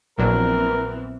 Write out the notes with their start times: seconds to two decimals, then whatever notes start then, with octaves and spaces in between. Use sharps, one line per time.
0.18 A#1 E3 F#3 B3 C4 D4 A#4